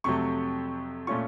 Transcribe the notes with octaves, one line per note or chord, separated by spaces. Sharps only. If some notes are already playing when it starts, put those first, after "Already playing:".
F2 C3 F#3 A3 C#6
A#2 A3 C#4 F4 C#6